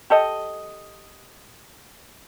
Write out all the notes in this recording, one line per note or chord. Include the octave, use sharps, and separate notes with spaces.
G4 A4 D#5